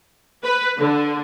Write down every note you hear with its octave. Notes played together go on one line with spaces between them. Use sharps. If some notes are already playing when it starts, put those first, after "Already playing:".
B4
D3